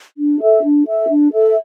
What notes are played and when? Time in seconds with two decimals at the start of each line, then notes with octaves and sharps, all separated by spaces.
0.18 D4
0.41 A4 E5
0.64 D4
0.86 A4 E5
1.09 D4
1.32 A4 E5